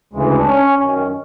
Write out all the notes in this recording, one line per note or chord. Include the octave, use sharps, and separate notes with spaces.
D2 C#3 E3 G#3
D4
C#4
F#2 D#3 C#4